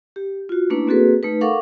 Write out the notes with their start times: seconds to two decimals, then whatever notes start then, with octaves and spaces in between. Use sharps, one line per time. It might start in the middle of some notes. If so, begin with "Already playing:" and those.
0.16 G4
0.49 F4 F#4
0.70 A3 A#3 C#4 D4 E4 B4
0.87 A#3 C4 F#4 G#4 A4 B4
1.23 A3 D#4 B4
1.41 A4 A#4 F5 F#5 C#6 D6